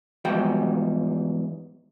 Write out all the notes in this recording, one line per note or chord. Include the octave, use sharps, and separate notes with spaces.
E2 G#2 F3 G3 F#4 G5